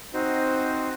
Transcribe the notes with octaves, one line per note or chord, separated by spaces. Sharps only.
C4 D#4 F#4 C5